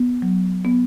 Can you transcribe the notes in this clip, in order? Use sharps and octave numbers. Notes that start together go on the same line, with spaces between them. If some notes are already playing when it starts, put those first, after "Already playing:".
Already playing: B3
F#3
B3